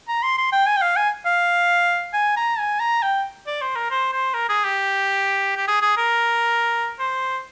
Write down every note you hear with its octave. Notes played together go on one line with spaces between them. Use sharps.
A#5
C6
C6
G5
G#5
G5
F5
G#5
F5
G#5
A#5
G#5
A#5
G5
D5
C5
A#4
C5
C5
A#4
G#4
G4
G4
G#4
G#4
A#4
C5